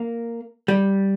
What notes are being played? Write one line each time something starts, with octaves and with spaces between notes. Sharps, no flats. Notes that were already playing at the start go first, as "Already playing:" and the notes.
Already playing: A#3
G3